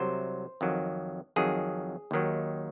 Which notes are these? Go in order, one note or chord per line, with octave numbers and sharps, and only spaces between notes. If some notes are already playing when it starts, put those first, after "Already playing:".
Already playing: C2 C3 F#3 C5
F2 D#3 F#3
F2 D#3 F#3 G#4
D#2 D#3 F#3